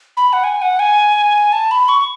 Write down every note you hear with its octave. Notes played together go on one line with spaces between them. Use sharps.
B5
F#5
G#5
F#5
G#5
A5
B5
C#6